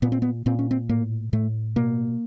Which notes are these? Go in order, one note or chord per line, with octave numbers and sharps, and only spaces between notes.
A#2 B3
C4
B3
A#2 C4
C#4
C4
A2 A#3
A2 A3
B2 A#3